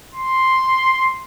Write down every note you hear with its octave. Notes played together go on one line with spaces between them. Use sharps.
C6